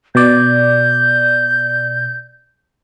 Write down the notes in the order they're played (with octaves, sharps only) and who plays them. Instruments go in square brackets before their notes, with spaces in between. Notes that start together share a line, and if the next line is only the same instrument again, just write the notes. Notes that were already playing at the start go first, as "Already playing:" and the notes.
[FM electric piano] B2 D5 [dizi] G6